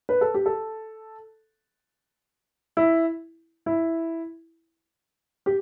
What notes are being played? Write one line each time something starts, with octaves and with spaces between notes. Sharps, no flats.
B4
A4
G4
A4
E4
E4
G4